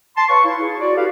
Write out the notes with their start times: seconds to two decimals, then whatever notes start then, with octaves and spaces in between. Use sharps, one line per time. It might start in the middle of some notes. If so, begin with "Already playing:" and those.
0.16 A5 C6
0.28 B4 C#5 F5 C#6
0.45 E4
0.61 E4 G#4
0.79 F#4 D5
0.96 E4 F#4 G4 A4 B4 F5